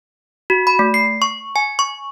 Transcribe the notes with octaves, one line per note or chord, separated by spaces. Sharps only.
F#4
B5
A3
C7
C#6
G#5
C#6